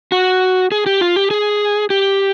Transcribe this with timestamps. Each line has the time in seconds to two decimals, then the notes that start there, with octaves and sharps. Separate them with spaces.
0.12 F#4
0.72 G#4
0.86 G4
1.01 F4
1.16 G4
1.31 G#4
1.90 G4